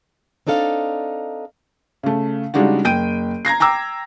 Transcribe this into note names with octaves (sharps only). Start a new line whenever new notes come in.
C4 D4 D#4 A4 F5
C#3 A3
C#3 G3 G#3 D4 D#4 F#4
F#1 G5 G6 D7 D#7
A#5 G#6 A#6 C7
G5 A#5 D6 E6